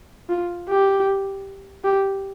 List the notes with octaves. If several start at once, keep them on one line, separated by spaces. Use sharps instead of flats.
F4
G4
G4